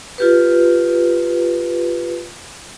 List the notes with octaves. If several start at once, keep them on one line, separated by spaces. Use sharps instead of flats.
F4 G4 B4